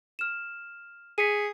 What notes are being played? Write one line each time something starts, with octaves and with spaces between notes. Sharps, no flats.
F6 E7
G#4 B6 C#7 D#7